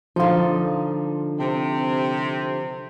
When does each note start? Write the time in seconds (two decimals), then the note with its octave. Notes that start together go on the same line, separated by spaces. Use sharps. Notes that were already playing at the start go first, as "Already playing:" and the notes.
0.16 D3 F3 D#4 F4
1.39 C3